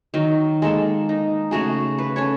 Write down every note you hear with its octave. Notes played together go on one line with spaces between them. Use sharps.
D#3 F#3
G#3 A#3 A4
D#4
C#3 A3 F#4 G#4
B4
C#4 A4 C#5